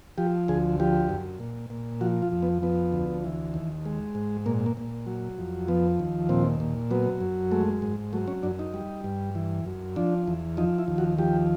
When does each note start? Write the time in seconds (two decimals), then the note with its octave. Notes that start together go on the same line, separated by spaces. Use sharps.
0.18 F3 G4
0.48 D2 G#4
0.80 F3 G4
1.09 F#2
1.40 A#2
1.70 A#2
2.01 F3 F#4
2.22 F4
2.32 F2
2.43 B3
2.62 F3 B3
2.92 D2
3.24 E3
3.54 D#2
3.85 G#3
4.15 G#2
4.46 A#2 A#3
4.66 A#3
4.77 A#2
5.07 F#3
5.38 F2
5.68 F3 B3
5.99 D#2
6.29 A#2 C4
6.60 A#2
6.91 F#3 B3
7.21 F#2
7.51 G#3 A3
7.82 G#2
8.13 F#3 A3
8.28 C#4
8.43 F#2 D4
8.59 D#4
8.74 G3
9.04 G2
9.35 E3
9.66 F#2
9.96 F3 D4
10.27 E2
10.57 F3 D#4
10.78 E4
10.88 D#2
10.98 F#4
11.18 F3 G4